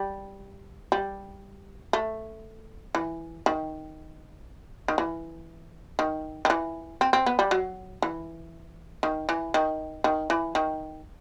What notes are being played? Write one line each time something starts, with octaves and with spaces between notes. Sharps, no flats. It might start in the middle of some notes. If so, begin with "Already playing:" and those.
Already playing: G3
G3
A3
E3
D#3
D#3
E3
D#3
D#3
E3
C4
C4
B3
G3
F#3
E3
D#3
E3
D#3
D#3
E3
D#3